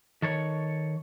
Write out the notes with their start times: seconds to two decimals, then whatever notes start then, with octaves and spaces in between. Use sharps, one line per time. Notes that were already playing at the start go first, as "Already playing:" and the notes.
0.22 D#3 A4 C#5